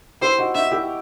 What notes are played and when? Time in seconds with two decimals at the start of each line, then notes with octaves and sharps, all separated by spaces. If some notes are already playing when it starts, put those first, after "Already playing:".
0.21 E4 G4 C5
0.38 D#4 F#4
0.55 D#4 F#4 E5
0.71 E4 G4